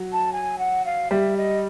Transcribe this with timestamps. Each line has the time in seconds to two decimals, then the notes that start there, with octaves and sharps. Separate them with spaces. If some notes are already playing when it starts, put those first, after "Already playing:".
Already playing: F#3
0.12 A5
0.33 G#5
0.59 F#5
0.85 F5
1.11 G3 E5
1.37 D#5